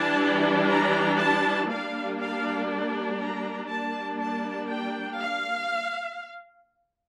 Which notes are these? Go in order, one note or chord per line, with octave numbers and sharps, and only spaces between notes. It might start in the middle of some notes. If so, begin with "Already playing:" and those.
Already playing: E3 G3 D4 A5
A#5
A5
G3 A#3 D4 F5
F5
A#5
G3 A#3 D4 A5
A5
G5
F5